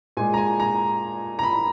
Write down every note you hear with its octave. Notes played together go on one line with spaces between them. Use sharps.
A#2 G#3 G#5
A#5
G#5
A#5
A#5
B5